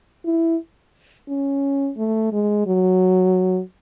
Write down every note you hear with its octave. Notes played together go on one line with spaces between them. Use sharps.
E4
C#4
A3
G#3
F#3